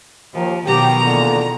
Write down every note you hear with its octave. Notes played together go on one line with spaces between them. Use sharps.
D#2 F3
B2 D#3 F#3 G4 A#5
E2 A#2 D3